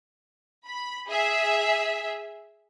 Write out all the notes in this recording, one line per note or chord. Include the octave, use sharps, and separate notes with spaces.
B5
G#4 E5